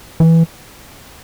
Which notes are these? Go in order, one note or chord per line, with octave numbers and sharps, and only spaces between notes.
E3